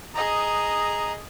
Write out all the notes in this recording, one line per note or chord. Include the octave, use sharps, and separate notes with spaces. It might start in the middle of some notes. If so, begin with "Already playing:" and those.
G#4 D#5 A#5